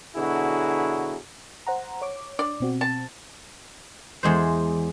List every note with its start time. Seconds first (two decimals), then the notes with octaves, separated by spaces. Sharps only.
0.15 B2 D3 F#3 E4 F#4 G#4
1.67 C5 F#5 A#5
2.02 C#5 D6
2.39 D4 D5
2.60 B2 C4 F#4
2.81 A5
4.23 E2 G#3 C5